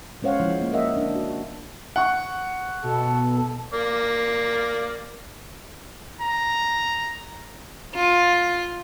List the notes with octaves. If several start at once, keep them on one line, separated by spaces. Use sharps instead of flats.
G#3 C#4 C5 C#5 F5 F#5
F3 G#3 E4
A#3
A#4 D#5 E5 F#5
D4
F#4
F#5 C#6
B2 A4
A#3 D5
A#5
F4